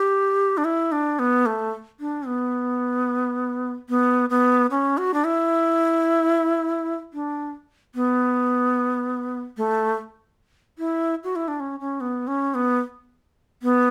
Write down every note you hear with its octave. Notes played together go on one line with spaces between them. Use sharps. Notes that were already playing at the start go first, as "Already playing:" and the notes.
Already playing: G4
D4
E4
D4
B3
A3
D4
B3
B3
B3
C#4
F#4
D4
E4
D4
B3
A3
E4
F#4
E4
D4
C#4
C#4
B3
C#4
B3
B3